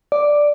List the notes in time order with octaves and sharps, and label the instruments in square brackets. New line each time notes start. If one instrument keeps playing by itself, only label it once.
[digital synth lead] D5